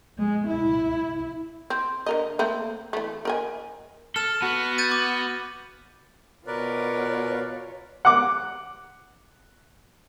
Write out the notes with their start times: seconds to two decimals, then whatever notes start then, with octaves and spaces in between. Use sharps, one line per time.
0.18 G#3
0.48 E4
1.70 C4
2.06 D3 A#4 D#5
2.39 A3 A#3 C4
2.93 E3 A3
3.25 A#4 D#5 G#5
4.16 A4 A5 F6 E7
4.42 B3 F#4
4.78 G6 A6 D#7
4.92 D6
6.47 B2 F4 A#4 B4 C#5 D5
8.05 F#5 D6